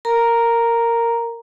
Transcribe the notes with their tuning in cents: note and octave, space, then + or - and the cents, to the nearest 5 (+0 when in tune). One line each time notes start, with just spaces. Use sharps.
A#4 -10 A#5 +0